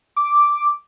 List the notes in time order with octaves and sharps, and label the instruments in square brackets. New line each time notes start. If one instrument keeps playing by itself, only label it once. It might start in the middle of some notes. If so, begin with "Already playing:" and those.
[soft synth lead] D6